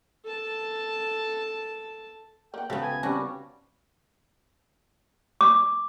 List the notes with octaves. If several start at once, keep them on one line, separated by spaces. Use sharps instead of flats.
A4 A5
A#3 F#5 G5
C#3 B3 F#4 A4 C5 C#5 E5 A5
G#5
G3 C4 C#4 F#4 G4 A5
D6